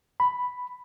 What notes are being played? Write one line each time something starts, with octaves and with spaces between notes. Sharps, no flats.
B5